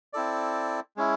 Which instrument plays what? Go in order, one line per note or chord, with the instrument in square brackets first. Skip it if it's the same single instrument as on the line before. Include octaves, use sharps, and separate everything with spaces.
[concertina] C4 E4 A4 D5
G#3 C#4 E4